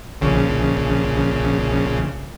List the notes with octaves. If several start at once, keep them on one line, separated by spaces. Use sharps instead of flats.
A#1 C#3